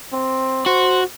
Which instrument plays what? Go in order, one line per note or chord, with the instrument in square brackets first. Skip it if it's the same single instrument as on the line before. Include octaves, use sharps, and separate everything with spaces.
[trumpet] C4
[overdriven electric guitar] F#4 [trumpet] C5